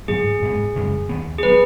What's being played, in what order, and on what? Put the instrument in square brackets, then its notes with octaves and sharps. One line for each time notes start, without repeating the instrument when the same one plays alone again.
[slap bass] G#2 F#3 B3 [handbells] G#4
[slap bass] G#2 G#3 B3
F#2 C#3 G#3
D#2 D#3 B3
[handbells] G#4
[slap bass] F#3 B3 [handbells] B4